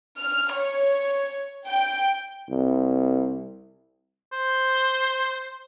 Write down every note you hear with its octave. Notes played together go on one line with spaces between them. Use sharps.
F6
C#5
G5
C2
C5